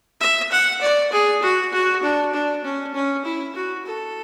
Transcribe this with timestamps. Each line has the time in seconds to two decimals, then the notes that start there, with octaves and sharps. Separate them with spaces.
0.20 E5
0.51 F#5
0.81 D5
1.12 G#4
1.42 F#4
1.73 F#4
2.03 D4
2.34 D4
2.64 C#4
2.95 C#4
3.25 E4
3.55 F#4
3.86 A4